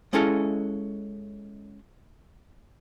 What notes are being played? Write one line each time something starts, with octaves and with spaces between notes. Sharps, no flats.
G#3 C#4 E4 A4 D#5 F5